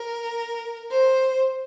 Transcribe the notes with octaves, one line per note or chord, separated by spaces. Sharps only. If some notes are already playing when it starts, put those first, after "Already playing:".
Already playing: A#4
C5